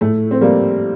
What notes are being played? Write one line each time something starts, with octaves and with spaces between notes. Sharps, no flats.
A2 A3
C4
G3 A#3